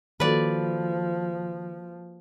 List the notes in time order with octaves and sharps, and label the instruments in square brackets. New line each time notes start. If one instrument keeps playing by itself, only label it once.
[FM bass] D#3 [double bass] F3 [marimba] A#3 F#4 A4 [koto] B4 D5